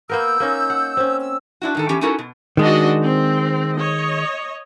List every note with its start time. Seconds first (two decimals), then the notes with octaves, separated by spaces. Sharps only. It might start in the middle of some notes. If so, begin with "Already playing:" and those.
0.09 A#3 B3 A#4 E6 G6
0.40 A#3 C#4 D#4
0.70 F#5
0.97 C4 C#4
1.20 E6
1.62 D4 E4 F#4
1.75 G#2 D#3 A4
1.89 E2 E3 C#4 G4
2.01 C#4 D#4 E4 F#4 A4 A#4
2.19 B2
2.57 D#3 G#3 D4 F#4 D#5
3.03 C4
3.75 C#5 D#5